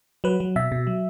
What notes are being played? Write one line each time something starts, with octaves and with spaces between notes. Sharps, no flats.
F#3 B4
F#3
B2 E5
B2
F#3